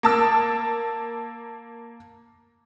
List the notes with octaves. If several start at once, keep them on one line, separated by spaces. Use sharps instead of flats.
A#3 A5 E6